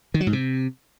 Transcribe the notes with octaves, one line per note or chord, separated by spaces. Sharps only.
D#3
F#3
G#2
C3